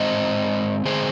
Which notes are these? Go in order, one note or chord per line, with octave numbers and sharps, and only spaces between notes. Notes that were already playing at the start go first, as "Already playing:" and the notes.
Already playing: G#2 G#3 C4 C5 D#5
D3 G#3 C4 G#4 C5